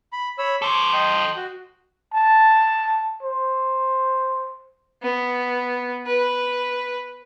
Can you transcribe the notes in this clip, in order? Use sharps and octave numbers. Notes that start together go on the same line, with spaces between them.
B5
C#5 B5 E6
A4 C5 C#6 D6
D#5 G5 C6
F#4
A5
C5
B3
B4